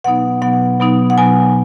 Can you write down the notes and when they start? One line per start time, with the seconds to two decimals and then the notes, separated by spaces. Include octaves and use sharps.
0.04 B2 F#3 B3 D#4 F#5
0.42 B2 F#3 B3 D#4 F#5
0.80 B2 F#3 B3 D#4
1.10 F#5
1.18 B2 F#3 B3 D#4 G#5